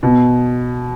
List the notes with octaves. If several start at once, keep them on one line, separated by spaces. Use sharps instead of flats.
B2